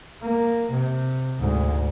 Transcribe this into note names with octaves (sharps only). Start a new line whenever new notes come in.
A#3
C3
D2 G#2